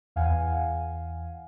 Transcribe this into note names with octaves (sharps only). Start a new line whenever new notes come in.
E2 F5 F#5 G#5